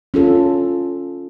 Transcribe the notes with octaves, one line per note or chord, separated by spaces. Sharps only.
C#4 F4 A4